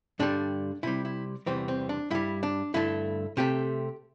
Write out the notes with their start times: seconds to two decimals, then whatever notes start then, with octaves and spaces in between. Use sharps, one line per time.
0.19 G2 D3 G3 D4
0.83 C3 G3 E4
1.05 E4
1.46 E2 C3 E3 G3 C4
1.68 C4
1.89 D4
2.10 G2 G3 E4
2.43 D4
2.74 G2 D3 A3 E4
3.37 C3 A3 G4